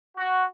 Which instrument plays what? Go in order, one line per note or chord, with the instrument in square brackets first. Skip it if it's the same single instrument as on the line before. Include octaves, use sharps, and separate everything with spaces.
[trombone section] F#4